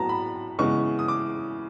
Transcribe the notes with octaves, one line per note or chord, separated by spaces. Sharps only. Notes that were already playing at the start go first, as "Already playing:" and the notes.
Already playing: A2 F#3 B3 A5 A#5
B5
C#3 E3 G#3 B3 C#6
D#6
D6